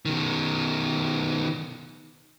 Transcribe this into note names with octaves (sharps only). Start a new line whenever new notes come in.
B2 D#3